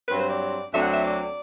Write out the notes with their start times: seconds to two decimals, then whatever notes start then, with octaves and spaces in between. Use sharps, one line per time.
0.08 G2 F#3 C4 B4
0.19 C5
0.30 D5
0.72 D2 D3 F#3 C4 E5
0.83 F#5
0.92 E5
1.03 D5